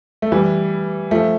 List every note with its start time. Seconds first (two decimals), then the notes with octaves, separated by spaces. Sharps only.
0.22 A3
0.32 E3 G3
1.11 F3 A3